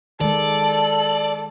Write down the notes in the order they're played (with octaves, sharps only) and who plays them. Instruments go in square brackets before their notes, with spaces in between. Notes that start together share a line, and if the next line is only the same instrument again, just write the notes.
[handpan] D#3 G#3 [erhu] A4 [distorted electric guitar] D5